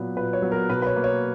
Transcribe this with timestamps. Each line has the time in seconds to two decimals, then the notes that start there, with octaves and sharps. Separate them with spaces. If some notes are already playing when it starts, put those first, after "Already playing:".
Already playing: A#2 F#3 B3 B4
0.16 A#2 B4
0.33 C#5
0.42 F#3 B3
0.52 A#4
0.70 B2 B4
0.82 B4
0.87 C#5
0.96 A#3
1.04 C#5